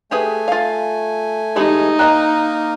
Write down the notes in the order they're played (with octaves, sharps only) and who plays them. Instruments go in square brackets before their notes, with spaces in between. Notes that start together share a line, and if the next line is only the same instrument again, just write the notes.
[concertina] A3 G#5 [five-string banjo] G4 G#4 B4
[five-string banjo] F4 F5
[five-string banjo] E3 G#3 B5 [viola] D#4 [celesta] G4
[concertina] A#3 A#4 [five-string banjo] D#5 G5 [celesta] A#5 F#6